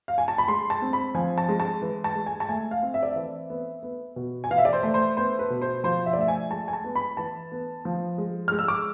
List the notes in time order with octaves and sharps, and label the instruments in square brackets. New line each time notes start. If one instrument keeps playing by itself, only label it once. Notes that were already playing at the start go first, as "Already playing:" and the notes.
[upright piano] F5
G#5
A5
B5
G#3 C6
A5
C4
B5
F3 G#5
A5
G#3
A5
E3
A5
G#3
G#5
A5
A3 G#5
F5
C4
E5
D5
E3 E5
B3
B3
B2
G#5
E3 F5
E5
D5
C5
A3
C5
B3 C5
B4
B2
C5
F3 C5
E5
D5
A3 E5
G#5
G#3 A5
G#5
A5
B3
B5
E3 A5
B3
F3
G#3
G#3 F6
E6
D6